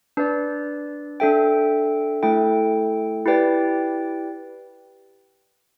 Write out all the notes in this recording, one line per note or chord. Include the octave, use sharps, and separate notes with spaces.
D4 B4 D5
D4 A4 E5 G5
A3 E4 A4 G5
E4 G4 B4 D5 G5